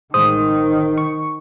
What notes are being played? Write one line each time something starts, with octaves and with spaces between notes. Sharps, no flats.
A1 D#3 G#3 C5 D#6
C#6